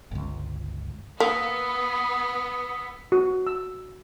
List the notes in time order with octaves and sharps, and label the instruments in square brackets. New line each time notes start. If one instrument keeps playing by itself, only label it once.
[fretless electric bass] G1 C#2
[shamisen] A#3 [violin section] B3 [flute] D#6 [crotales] E6 B6
[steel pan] F#4
E6